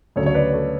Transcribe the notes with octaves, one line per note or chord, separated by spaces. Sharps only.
D2 C#3 F#3 A4 C#5
C#5
B4 D5
A4 C#5